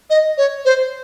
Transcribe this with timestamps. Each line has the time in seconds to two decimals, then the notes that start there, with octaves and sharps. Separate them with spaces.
0.10 D#5
0.38 C#5
0.65 C5